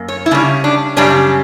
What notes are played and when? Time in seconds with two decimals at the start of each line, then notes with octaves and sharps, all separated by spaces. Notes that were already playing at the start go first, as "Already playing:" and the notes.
Already playing: F#2 A#3
0.08 C#5
0.26 E4
0.31 C#3 G3 C#4 D4
0.64 D4
0.97 F#2 C#3 G3 C#4 D4